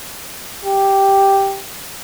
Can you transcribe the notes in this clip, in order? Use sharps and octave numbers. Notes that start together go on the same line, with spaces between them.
G4